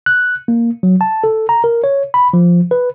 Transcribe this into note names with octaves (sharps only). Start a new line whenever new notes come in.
F#6
A#3
F#3
A5
A4
A#5
A#4
C#5
B5
F3
B4